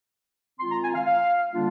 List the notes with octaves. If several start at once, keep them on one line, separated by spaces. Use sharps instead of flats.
D#3 G#3 C4 F4 C6
A#5
G#5
F5
F5
D3 G3 A#3 D4 F4